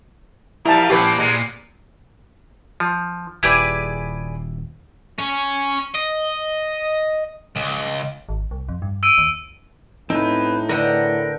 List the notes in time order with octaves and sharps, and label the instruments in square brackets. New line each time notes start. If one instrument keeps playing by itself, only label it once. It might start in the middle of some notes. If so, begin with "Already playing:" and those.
[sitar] A#2 F3 G3 [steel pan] E4 A5 [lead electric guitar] A#4
[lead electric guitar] A#2 [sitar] F3 C4 C#4 [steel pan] G4 B4
[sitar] G#3 B3 [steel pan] A#5
[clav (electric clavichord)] F3
[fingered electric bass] D#1 [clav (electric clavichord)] E4 G4 [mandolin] G#4 B4 D5
[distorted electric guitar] C#4
D#5
C#2
[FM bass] G#1
C2
F2
G2
[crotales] E6 D7 D#7
[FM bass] D#2
[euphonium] A2 [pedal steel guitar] C4 C#4 B4 [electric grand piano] D#4
[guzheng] D3 B3 [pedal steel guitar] A#4 F#5 G5